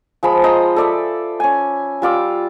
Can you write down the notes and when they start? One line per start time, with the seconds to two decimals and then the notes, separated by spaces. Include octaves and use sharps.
0.23 F3 G#3 B5
0.44 C5 D#5 A#5 B5
0.76 A4 D5 E5
1.40 C#4 G#5
2.02 G3 F4 D6 E6